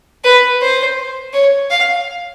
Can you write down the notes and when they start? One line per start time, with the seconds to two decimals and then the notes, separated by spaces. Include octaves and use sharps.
0.24 B4
0.62 C5
1.33 C#5
1.71 F5